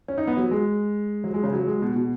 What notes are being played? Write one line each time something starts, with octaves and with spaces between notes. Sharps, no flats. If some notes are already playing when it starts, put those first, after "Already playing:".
C#4
D#4
B3
F#3
G#3
F#3
G#3
C#3
F#3
G#3
B2
B2